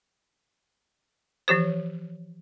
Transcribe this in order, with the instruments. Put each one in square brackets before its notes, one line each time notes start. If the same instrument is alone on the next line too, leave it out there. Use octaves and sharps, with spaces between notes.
[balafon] E3 F3 G4 C5